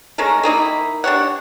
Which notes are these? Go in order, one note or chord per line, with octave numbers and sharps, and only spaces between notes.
G#3 A3 C#4 A#4
D#3 A#3 D#4 E4
D4 G4 C#5 F#5